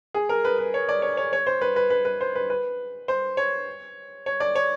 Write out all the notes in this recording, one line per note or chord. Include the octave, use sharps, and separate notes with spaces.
G#4
A#4
B4
B4
C#5
D5
C#5
C#5
C#5
C5
B4
B4
B4
B4
C5
B4
B4
C5
C#5
C#5
D5
C#5